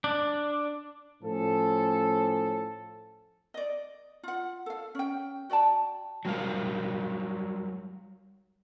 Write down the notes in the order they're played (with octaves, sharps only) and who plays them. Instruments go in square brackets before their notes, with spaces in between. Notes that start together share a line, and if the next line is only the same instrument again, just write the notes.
[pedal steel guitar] D4
[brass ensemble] A2 F3 C#4 A4
[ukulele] D5 D#5
F4 F#5
A4 F5
C#4 G5
F#4 D5 G5 A5
[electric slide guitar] F#3 G3 A#4 F5